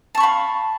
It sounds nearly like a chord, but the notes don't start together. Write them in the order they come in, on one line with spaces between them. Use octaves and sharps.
A5 C#6 B5 F5